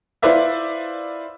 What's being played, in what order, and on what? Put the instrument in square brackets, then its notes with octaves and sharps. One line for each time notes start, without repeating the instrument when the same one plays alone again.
[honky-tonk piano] E4 F4 B4 C5 D5 E5